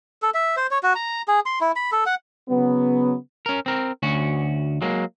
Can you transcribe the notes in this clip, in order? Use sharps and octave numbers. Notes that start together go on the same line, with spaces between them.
A4
E5
C5
C#5
F#4
A#5
G#4
C6
E4
B5
A4
F#5
C#3 F#3 B3
C#4 A#4
C4 A#4
D2 C#4 F#4
F#3 G#3 A#3